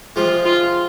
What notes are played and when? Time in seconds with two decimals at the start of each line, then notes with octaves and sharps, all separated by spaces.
0.16 C3 F3 G#3 F4
0.45 F4